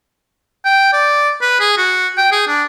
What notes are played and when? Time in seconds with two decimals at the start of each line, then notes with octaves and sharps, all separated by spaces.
0.65 G5
0.93 D5
1.41 B4
1.60 G#4
1.77 F#4
2.17 G5
2.32 G#4
2.47 D4